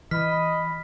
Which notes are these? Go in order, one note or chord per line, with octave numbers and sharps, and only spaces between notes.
E3 D#5 B5 F6 B6